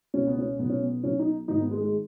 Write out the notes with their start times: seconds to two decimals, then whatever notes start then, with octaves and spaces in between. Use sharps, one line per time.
0.14 C#2 B2 C#4
0.27 B3
0.38 C#4
0.59 B1 B2 B3
0.70 C#4
0.82 B3
1.03 B1 B2 C#4
1.19 D#4
1.48 G#1 G#2 D#3 D#4
1.60 B3
1.71 G#3
1.82 G#3